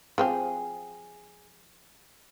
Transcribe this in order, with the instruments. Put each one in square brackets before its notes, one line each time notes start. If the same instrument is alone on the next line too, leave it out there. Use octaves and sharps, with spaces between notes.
[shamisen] F3 C4 G4 [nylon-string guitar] G#4